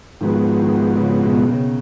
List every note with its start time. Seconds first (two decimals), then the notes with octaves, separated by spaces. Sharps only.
0.21 G#2 D#3 F3 G#3 B3 F#4
0.59 D#3
0.97 C#3
1.23 B2
1.48 C#3